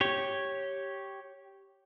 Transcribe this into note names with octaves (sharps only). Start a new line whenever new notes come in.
G4 C#5